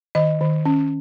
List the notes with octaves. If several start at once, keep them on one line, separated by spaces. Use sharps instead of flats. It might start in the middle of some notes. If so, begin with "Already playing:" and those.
D#3 D#5
D#3
C#4